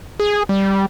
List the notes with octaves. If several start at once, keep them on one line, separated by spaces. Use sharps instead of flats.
G#4
G3